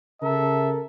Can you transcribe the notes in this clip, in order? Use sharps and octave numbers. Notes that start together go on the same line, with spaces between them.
C#3 A4 A#4 E5